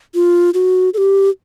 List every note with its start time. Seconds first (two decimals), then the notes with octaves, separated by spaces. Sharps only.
0.15 F4
0.54 F#4
0.94 A4
0.98 G4